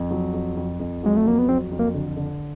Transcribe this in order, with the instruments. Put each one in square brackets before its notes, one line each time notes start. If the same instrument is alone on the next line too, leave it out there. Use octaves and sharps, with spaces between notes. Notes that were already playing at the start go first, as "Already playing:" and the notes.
Already playing: [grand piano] F2
F#3
F2
F2
F2
[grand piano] F#3 [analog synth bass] G#3
[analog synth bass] A3
[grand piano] F2 [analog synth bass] A#3
[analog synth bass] B3
[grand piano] F#3 [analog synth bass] C4
[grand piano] F2
[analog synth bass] A#3
[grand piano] D3
D3